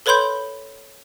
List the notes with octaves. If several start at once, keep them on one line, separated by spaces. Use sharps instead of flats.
A4 B4 C#5 B5 C6 G6